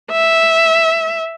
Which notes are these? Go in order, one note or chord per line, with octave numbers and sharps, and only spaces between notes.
E5